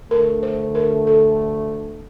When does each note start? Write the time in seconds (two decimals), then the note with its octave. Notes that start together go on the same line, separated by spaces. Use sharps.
0.11 D2 D3 A3 A#4
0.43 C5
0.75 A#4
1.07 A4